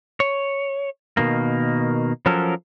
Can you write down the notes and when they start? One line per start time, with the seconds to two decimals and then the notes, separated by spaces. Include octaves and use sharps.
0.20 C#5
1.17 B2 D#3 A#3
2.26 F3 F#3 C#4 A4 A#4